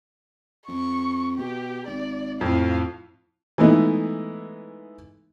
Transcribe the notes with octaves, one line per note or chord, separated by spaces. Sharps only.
F2 C#6
B2 G4
G#1 D5
F2 A2 F5
E3 G#3 A3 B3 D#4